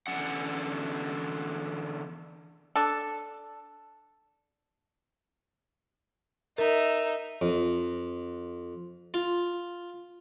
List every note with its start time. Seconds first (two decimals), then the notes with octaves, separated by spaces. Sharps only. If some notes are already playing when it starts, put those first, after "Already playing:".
0.07 E2 D3 G3 C#4 F#5
2.76 D4 A4
6.58 D#4 A#4 E5
7.41 F2
9.14 F4